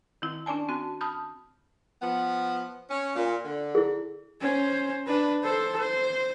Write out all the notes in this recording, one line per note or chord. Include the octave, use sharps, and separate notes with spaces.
D#3 C4 E4
C#4 D4 D5 G#5 A5
C4 F#4 A5
A5 B5 D#6 F6 G6
F3 B3
C#4
A#2
D3
E4 G#4
C#4 C5
D4 B4
A4 C5
C5